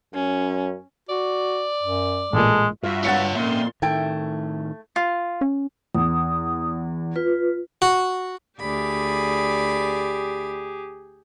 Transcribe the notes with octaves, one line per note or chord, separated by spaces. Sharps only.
F#2 C#4
F#4 D5
F#2
A1 A#2 G#3 A4
G2 F4 F#4 E5
F4 C#5 F#5 A6 C#7
F2 A#2 D#3 C#4 E5 C6
A2 D#3 A3 E4 G5
F4
C#4
E2 D#6
F4 B4
F#4
D2 G4 G#4 D5 B5